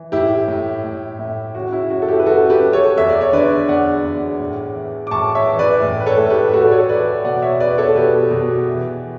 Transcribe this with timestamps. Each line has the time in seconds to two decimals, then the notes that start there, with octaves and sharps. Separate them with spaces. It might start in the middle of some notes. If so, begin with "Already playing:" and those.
Already playing: E3
0.12 A2 E4 G4
0.48 A2
0.84 A2
1.19 A2
1.55 C#3 F#4
1.73 E4
1.90 F#2 F#4
2.02 A4
2.08 E4 G4
2.19 B4
2.26 C#3 F#4 A4
2.50 G4 B4
2.62 F#2
2.73 A4 C#5
2.97 E2 E5
3.09 D5
3.21 C#5
3.33 D3 B4 D5
3.68 E2 D5 F#5
4.04 E2
4.40 A2
4.75 E3
5.07 D6
5.11 A2 A5 C#6
5.35 C#5 E5
5.47 E3
5.59 B4 D5
5.82 A2
6.00 B4
6.06 A4 C#5
6.18 A2
6.30 G4 B4
6.48 B4
6.53 A2 F#4 A4
6.67 D5
6.71 A4 C#5
6.89 E3 B4 D5
7.24 B2 D5 F#5
7.42 C#5 E5
7.60 E2 B4 D5
7.78 A4 C#5
7.95 B2 G4 B4
8.31 B2
8.68 E3